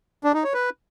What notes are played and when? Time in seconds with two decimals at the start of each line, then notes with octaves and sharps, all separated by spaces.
0.24 D4
0.34 D#4
0.44 C#5
0.54 B4